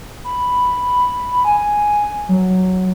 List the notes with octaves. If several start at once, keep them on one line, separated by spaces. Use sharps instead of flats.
B5
G#5
F#3